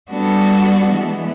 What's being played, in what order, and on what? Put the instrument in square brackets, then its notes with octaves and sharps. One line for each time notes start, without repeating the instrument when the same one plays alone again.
[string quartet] G3 B3 D4 F#4 A4
E3 G#3 B3